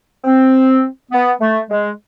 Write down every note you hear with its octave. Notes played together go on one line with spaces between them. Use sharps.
C4
B3
A3
G#3